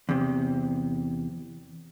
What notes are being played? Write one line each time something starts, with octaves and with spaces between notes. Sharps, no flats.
E2 C3